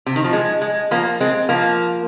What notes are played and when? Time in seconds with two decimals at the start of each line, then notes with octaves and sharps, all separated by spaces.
0.06 C3
0.16 D#3
0.24 F3
0.33 G#3
0.62 G#3
0.91 F3 A#3
1.20 G#3 C4
1.49 F3 A#3